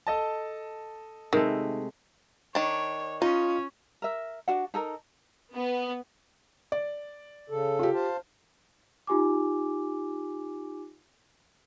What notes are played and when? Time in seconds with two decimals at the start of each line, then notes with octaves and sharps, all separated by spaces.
0.07 A4 D#5 A5
1.33 C3 D#3 G#3 A3
2.55 D#3 D4 C#5
3.22 C#4 D#4 F4
4.02 A#4 E5
4.48 D4 F#4 F#5
4.74 D#4 A4 A#4
5.54 B3
6.72 D5
7.50 C#3 A4
7.79 F4 G4
7.94 C5 F5 A5
9.07 D#4 F4 G4 G#5 D6